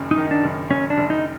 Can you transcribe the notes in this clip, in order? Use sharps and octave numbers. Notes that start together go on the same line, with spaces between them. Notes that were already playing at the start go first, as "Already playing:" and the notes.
Already playing: F#1 F#2 D#3
D#4
D#3
D4
F#1
F#1 C#4
D4
F#1
D#4